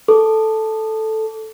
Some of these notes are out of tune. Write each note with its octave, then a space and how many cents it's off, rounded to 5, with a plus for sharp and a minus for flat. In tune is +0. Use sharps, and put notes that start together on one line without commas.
A4 +0 D6 -20